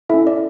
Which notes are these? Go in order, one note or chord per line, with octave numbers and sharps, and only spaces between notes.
C#4 E4 A4 E5
D5